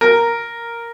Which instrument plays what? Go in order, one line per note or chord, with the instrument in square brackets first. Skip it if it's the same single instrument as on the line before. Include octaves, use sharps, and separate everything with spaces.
[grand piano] A#4